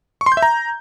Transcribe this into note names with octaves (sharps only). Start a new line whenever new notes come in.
C#6
C6
G6
E5
A#5